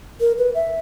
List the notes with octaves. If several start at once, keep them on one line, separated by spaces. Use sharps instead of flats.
A#4
B4
E5